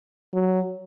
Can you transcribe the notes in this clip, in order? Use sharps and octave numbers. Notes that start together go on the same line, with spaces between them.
F#3